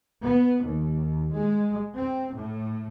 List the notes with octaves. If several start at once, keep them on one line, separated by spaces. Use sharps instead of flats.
B3
D#2
G#3
C4
A2